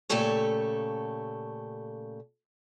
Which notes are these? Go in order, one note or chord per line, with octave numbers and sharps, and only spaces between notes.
A#2 C#3 A3 G4 A4 C#5